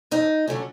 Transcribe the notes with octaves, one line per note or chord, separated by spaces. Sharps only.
F2 D#4
D3 F#3 A3 C#4